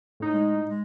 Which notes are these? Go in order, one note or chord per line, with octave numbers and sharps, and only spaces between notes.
A2 D#4
G#3
G#3